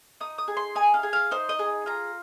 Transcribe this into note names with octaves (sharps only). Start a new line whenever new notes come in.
D#4 D#6
D#6
G#4
C6
D#4 G#5
F5
G#4
F5
D#4 C5
D#5
G#4
F4 A#5